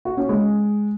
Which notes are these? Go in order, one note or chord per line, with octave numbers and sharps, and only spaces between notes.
F#4
C#4
G#3